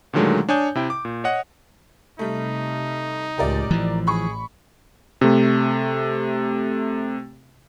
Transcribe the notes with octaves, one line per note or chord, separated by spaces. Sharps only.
A#2 D3 D#3 F#3 G#3 A3
D4 C#5 G#5 D#6 G6
C3 E4 G5
D6
A#2
C#5 D#5 F#5
C3 G3 A3 D#4
C#2 A2 G4 A#4 D5
A1 E3 F3
G#4 B5 C#6
C3 A3